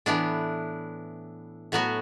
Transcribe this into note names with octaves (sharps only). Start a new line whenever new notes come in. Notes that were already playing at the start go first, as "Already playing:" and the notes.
A2 E3 B3 D4
A2 F#3 B3 F#4